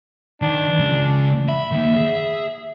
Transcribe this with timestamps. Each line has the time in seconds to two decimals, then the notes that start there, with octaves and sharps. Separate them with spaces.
0.42 D#3 D4
0.79 C#3 G#3
1.49 E5 B5
1.72 D#3 A#3
1.97 G#4